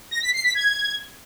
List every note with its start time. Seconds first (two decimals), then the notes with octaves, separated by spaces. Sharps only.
0.11 A#6
0.22 B6
0.33 C7
0.44 B6
0.55 G#6